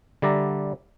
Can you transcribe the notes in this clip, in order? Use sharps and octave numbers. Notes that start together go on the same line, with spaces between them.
D3 G3 D5 E5 A#5